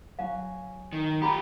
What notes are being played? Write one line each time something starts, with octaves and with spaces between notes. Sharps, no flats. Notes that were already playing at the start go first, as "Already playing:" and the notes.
F#3 F5 G#5 E7
D#3
F4 G4 A#5 B5